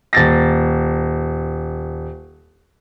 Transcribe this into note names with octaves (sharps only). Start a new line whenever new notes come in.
D#1 A6 A#6